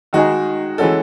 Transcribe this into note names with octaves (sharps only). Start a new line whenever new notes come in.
D#3 G#3 D#4 F#4 G#4
E3 G#3 C#4 F#4 A4